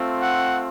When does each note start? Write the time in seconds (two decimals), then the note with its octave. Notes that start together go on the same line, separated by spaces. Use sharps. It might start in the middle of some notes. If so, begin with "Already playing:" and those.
Already playing: A3 C4 F4
0.23 F#5